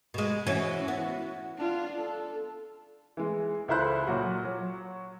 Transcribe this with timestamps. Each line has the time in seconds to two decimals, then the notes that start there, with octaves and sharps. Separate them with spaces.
0.14 B2 G#3
0.47 E3 C#4 E4 F#4
0.88 B3
1.58 D4 F4
1.99 A4
3.17 E3 G#3
3.68 C#2 E4 A4 C5 B5 F#6
4.07 A#2 F#3 F#4
4.44 F#3